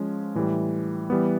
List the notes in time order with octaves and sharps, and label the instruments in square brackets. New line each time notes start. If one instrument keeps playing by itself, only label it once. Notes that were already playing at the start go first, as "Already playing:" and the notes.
Already playing: [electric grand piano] F3 G#3 C#4
A2 E3 G3
E3 G3 B3